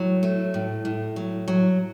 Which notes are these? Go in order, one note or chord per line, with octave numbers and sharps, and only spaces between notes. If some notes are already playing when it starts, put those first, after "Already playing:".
Already playing: A2 F#3
A3
A2
A2
F#3
F#3